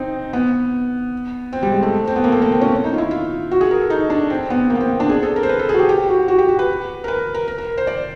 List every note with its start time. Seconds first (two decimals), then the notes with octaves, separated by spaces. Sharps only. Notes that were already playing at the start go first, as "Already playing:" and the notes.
Already playing: C4 D#4
0.33 B3
1.53 C4
1.63 G3
1.72 G#3
1.83 A3
2.07 C4
2.16 B3
2.24 A#3
2.32 A3
2.42 A#3
2.52 C4
2.61 C#4
2.84 D#4
2.94 F4
2.98 E4
3.11 F4
3.51 F#4
3.61 G#4
3.71 A#4
3.81 A4
3.90 D#4
4.10 D4
4.30 C4
4.50 B3
4.70 A#3
4.75 B3
4.80 C4
5.00 D4
5.09 G#4
5.23 A4
5.36 A#4
5.43 C5
5.49 B4
5.59 A4
5.69 G#4
5.74 F#4
5.79 G4
5.89 G4
6.09 F#4
6.28 F#4
6.39 G4
6.48 F#4
6.59 B4
7.04 A#4
7.08 B4
7.34 A#4
7.48 A#4
7.58 A#4
7.77 C5
7.87 D5